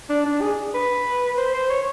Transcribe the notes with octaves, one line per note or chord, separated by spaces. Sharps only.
D4
D4
G#4
B4
C5
C5
C#5